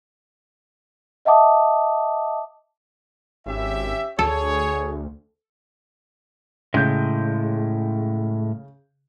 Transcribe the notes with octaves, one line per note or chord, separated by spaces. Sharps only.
D#5 E5 F#5 A5 D6 D#6
G#1 C#4 G4 E5
D2 G#4 A4 C#5
A2 C#3 G#3 G6